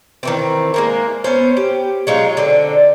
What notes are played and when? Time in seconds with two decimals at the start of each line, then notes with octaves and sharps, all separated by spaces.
0.23 D#3 E3 C4
0.74 G#3 A#3 A#4
1.24 B3 C#4 C5
1.57 G4
2.07 F#3 G#3 D#4 F4
2.37 D3 C4